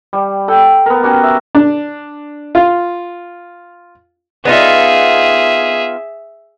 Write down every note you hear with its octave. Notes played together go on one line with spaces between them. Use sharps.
G3
A4 G5
B3 A#4
C#4 F#4 G4
E5
D4
F4
B3 D#4 F4 G#4 E5